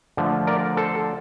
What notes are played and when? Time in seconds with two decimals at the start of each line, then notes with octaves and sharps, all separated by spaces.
0.17 D3 F3 A3
0.47 A#4 D5
0.77 A4 C5